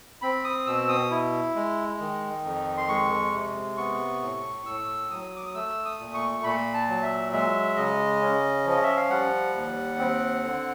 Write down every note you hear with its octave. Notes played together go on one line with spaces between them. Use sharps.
C4 B5
D#6
B2 E6
D#6
E4
G#3
D#3
F2
C6
G#3 C#6
C3
B3 C#6
A2
A2 E6
F#3 D#6
D6
D#6
A3 E6
D#6
A#2
C#6
A#2 B5
A5
F#3
E5
G#3 E5
C#3 D#5
C#4
F3 D#5
E5
F5
G3 F#5
D#2
C4
D3